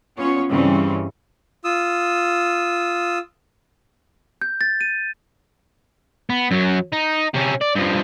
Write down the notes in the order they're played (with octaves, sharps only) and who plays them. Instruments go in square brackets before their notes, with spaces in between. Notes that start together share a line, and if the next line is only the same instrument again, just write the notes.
[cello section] B3 C#4 F4 C#5
G2 C#3 E3 G3 C4 C#4
[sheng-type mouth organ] F4 D#6 E6
[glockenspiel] G6
A6
D#7
[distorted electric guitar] B3
F#2 F#3
D#4
C3 C#4
D5
G2 F3